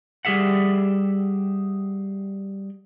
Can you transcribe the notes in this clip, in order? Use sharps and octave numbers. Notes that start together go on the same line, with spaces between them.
G3 G4 G#4 E5 F#5